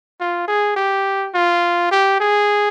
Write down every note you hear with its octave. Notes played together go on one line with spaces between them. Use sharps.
F4
G#4
G4
F4
G4
G#4